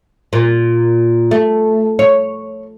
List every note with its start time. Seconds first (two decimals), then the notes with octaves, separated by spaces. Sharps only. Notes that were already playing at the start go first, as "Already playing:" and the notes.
0.33 A#2
1.31 A3
1.99 C#5